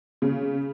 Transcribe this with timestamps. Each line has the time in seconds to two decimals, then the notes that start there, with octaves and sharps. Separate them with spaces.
0.22 C#3